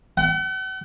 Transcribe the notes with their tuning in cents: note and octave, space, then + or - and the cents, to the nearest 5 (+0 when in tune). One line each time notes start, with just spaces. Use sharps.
F#5 +45